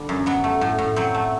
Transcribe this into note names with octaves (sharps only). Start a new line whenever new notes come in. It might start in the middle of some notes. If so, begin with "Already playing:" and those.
Already playing: D3 G3
F#2
F#3 B3
A3
A2
A2
F#3 C4
A3